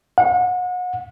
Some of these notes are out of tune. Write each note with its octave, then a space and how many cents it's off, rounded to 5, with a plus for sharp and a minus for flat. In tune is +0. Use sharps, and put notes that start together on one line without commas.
F#5 -35